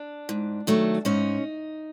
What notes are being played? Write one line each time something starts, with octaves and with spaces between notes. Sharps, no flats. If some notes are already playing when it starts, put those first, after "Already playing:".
Already playing: D4
G#2
D#3 F#3 A3
G#2 C#4 D#4